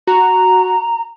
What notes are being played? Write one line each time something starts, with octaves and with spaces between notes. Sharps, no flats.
F#4 A#5